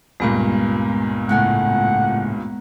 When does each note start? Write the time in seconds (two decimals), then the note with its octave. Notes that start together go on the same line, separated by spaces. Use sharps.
0.20 C#2 G2 A#2 G#3 B3 A#5
1.29 A2 C#3 A3 F#5